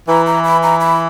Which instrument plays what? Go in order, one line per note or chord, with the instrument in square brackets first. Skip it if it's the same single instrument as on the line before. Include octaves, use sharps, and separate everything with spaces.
[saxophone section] E3 [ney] A#5
[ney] A#5
B5
A#5
B5